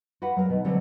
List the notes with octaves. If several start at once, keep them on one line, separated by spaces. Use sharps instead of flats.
F#4 G4 B4 F5 F#5
F#3 G#4 A#4
B2 D#3
D3 F#3 G#3 C4 G4